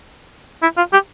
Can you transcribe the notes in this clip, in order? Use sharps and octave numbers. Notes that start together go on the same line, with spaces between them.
E4
F4
G4